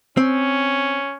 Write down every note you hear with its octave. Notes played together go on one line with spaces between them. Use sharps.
C4 C#4